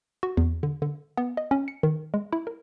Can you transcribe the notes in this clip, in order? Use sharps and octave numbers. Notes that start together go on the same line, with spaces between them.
F#4
E2
D3
D3
B3
D#5
C#4
C#7
D#3
G#3
E4
A#4